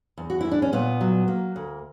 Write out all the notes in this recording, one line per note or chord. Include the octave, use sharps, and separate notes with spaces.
E2
F#4
E2 E4
D4
C#4
A#2 B3
F#3
A#3
D2